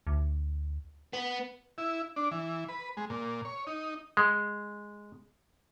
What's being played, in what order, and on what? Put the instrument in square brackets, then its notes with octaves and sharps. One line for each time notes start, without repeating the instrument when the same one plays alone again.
[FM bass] D2
[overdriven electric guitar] B3
[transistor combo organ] E4
D4
E3
B4
G#3
A#2
C#5
D#4
[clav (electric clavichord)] G#3